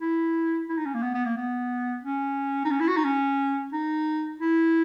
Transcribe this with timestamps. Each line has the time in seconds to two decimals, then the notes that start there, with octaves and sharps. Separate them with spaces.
0.01 E4
0.70 E4
0.77 D#4
0.85 C#4
0.94 A#3
1.02 B3
1.14 B3
1.25 A#3
1.37 B3
2.03 C#4
2.65 D#4
2.71 C#4
2.80 E4
2.88 F#4
2.97 D#4
3.04 C#4
3.72 D#4
4.40 E4